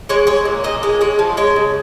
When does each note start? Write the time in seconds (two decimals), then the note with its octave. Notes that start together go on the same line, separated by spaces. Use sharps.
0.09 G#3 C#5
0.27 G#3 C#5
0.45 A#2
0.64 A#2 D#5
0.83 G#3
1.01 G#3 C#5
1.19 F3
1.37 G#3 C#5
1.56 C#3